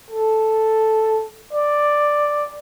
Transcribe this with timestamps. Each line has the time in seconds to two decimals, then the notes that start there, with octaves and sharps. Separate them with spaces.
0.10 A4
1.53 D5